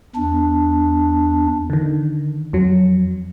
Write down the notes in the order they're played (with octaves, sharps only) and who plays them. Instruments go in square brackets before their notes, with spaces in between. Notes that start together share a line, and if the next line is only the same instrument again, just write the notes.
[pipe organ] E2 D4
[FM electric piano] D3 D#3
F2 F#3